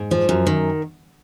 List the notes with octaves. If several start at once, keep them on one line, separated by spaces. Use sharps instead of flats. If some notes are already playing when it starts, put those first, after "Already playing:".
Already playing: G#2
F3
F#2
D#3